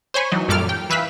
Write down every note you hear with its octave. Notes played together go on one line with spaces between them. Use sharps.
C5 C#5 G#5 B5 C#6
E3 F#3 D#4
F#2 A#2 G3 A4 D6 F6
G5
E3 B4 E5 F5 B6